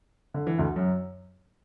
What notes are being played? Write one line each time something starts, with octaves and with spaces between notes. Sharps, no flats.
D3
E3
D2 D3
F#2 F#3